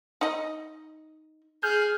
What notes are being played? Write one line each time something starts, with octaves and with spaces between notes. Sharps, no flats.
D#4 D#5
G#4 F6 G6